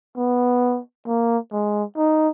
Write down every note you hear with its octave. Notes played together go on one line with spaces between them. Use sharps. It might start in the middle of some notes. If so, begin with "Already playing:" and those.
B3
A#3
G#3
D#4